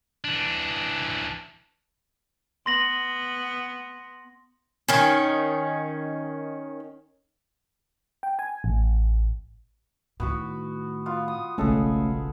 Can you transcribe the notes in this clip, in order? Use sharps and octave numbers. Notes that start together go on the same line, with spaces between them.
E3 D4
B3 C6 A#6 F#7
D#3 C#4
G5
G#5
A1
A2 D#3 B3 F#4 B4
B3 F4
D#6
F#1 B1 G#3 A3 C#4 G#4 A4 B4